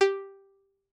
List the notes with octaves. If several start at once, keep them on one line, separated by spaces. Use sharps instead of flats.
G4